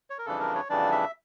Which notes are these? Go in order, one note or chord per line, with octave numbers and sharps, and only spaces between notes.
C#5
A#4
F2 C#3 E3 G3 D4 A4
A#4
C#5
F2 C#3 E3 G3 D4 D5
E5